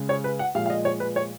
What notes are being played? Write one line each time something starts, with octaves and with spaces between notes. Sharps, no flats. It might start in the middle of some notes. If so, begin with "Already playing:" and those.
Already playing: C#3 G#3
C#5
B4
F#5
A#2 F3 G#3 F5
F5
D#5
C#5
B4
C#5